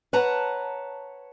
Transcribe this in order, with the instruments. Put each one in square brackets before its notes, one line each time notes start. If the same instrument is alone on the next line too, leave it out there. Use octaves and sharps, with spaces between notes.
[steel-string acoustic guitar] B4 C#5 F#5 A5 A#5